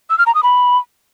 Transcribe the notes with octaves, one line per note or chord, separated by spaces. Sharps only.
E6
F6
A#5
D#6
B5